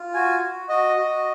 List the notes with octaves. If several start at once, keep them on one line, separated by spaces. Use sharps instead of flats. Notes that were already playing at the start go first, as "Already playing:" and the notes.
Already playing: F4
F#4 G#5
F#4
F#4 D#5
F#4